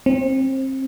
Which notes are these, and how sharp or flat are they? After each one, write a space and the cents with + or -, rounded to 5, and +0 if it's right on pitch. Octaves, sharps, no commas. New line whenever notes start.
C4 +25